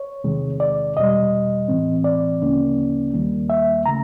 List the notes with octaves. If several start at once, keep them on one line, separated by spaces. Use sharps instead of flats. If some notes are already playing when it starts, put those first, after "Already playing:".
Already playing: C#5
E2 C3 D#3 G#3
D5
E2 B2 G3 D#5
A2 E3 G#3 C4
D5
D2 C#3 F3 A#3 C#4
D#2 D#3 G3 A#3
E5
C#3 F3 A3 A#5